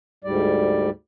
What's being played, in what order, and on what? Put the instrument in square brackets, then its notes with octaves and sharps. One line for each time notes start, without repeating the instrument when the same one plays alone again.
[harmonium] D2 G#2 G3 D5